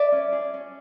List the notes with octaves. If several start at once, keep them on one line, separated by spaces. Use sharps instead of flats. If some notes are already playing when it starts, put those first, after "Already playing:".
Already playing: D5 E5
C#4
G#4
C#4